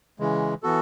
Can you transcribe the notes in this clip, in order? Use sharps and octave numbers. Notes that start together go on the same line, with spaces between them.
C#3 E3 G#3
E3 B3 F#4 A4